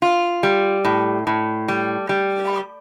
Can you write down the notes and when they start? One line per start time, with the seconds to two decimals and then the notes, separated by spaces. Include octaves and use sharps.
0.02 F4
0.43 G3
0.85 A2
1.27 A2
1.68 G3
2.09 G3